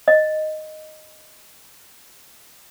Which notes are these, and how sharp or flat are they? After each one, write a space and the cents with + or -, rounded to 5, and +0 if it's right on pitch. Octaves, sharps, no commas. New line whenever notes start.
D#5 -5